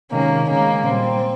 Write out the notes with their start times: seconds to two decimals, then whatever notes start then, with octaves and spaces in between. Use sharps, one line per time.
0.11 C3 D#3 G#3 A#3 C#4
0.49 C#3 G#3 A#3 C#4
0.87 A#2 G3 C4